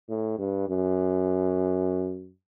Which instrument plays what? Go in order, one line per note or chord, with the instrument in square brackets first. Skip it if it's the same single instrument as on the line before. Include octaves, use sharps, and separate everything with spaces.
[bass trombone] A2
G2
F#2